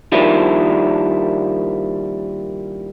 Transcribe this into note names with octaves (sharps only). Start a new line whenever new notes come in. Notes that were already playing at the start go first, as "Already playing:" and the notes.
D#3 F3 G3 A#3 D4 E4